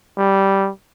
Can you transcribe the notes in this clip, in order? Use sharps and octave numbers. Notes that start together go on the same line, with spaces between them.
G3